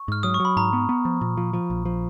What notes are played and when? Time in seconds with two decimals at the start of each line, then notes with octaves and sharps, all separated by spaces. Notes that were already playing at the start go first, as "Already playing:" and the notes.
Already playing: C#6
0.08 G#2 F6
0.23 F#3 D#6
0.34 C#6
0.40 F#3
0.45 B5
0.56 G#2 A#5
0.73 B3
0.89 B3
1.05 F3
1.21 A#2
1.37 F3
1.53 F3
1.70 A#1
1.85 F3